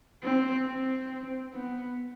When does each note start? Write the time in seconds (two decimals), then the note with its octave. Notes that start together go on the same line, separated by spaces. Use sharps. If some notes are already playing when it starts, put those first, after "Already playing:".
0.24 C4
0.67 C4
1.53 B3